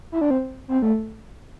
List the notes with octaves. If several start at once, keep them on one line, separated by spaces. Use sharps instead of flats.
E4
D4
C4
C4
A3